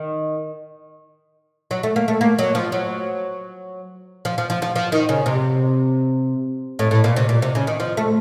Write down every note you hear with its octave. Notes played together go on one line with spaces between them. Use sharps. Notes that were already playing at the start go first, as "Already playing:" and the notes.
Already playing: D#3
F#3
A3
A#3
A3
A#3
F#3
F3
F#3
F3
F3
F3
F3
F3
D#3
C#3
C3
A2
A2
A#2
C3
A#2
C3
C#3
D#3
F3
A3